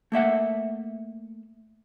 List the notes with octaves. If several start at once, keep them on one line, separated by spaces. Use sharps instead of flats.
A3 A#3 E5 F#5